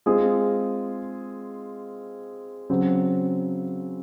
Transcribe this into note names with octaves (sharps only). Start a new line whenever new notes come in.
G#3 C4 F4 G#4
C#3 F#3 C4